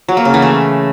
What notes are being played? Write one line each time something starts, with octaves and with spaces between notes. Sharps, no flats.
F#3
A#3
C#3
E3
A3